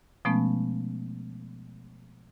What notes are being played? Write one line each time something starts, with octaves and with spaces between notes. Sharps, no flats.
B2 F3 G#3 A3 B3 C#4